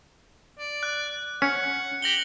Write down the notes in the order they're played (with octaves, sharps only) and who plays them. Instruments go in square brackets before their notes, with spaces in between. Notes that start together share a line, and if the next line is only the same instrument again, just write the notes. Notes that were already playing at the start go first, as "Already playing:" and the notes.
[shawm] D5
[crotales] F#6
[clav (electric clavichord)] C#4 [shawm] F#5 [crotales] C#7
[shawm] G4 [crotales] A#6 F#7 G7